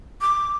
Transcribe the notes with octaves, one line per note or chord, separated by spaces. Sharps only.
D6